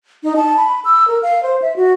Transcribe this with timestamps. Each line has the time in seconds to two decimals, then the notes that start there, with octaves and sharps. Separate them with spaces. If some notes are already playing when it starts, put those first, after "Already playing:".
0.23 D#4
0.36 A5
0.57 B5
0.85 E6
1.08 A#4
1.23 F5
1.43 C5
1.62 E5
1.76 F#4